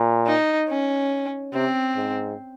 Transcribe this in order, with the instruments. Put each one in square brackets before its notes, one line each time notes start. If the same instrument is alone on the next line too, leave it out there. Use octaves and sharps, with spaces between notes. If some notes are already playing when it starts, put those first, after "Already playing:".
Already playing: [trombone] A#2
[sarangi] D#4
C#4
[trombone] C3 [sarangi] C4
[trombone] G#2